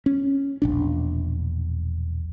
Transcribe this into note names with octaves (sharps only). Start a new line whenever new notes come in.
C#4
E1 A#1 D4